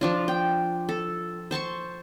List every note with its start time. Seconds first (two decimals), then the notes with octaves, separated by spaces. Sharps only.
0.01 F3 D4 F4
0.28 G5
0.89 A4
1.51 C5 A5 C6 C#6